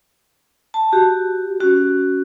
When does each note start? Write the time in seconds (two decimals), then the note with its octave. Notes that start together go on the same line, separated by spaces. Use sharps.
0.74 A5
0.93 F#4 G4
1.60 C#4 F#4